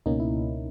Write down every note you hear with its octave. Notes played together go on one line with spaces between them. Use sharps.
C#2 B2 A#3 C#4 D#4
E4